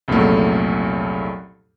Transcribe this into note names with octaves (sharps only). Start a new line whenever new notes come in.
C2 F2 A#2 C#3 F#3 A3